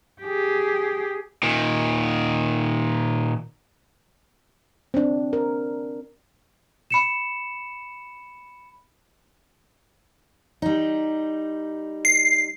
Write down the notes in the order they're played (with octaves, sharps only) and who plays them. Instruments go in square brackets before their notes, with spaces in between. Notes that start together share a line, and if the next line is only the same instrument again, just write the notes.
[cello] G4 G#4
[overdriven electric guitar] A#2 D#3
[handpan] C4 D4
A#4
[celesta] B5 C#7 E7
[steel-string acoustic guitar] G3 D#4
[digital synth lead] C7